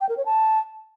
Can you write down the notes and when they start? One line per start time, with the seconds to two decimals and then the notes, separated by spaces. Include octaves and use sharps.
0.01 G5
0.09 A#4
0.17 C#5
0.26 A5